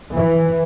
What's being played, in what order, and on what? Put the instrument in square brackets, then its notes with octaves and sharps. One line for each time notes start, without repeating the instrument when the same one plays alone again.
[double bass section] E3